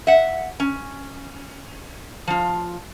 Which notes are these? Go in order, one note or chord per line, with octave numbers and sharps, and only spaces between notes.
E5 F#5
C#4
F3 F4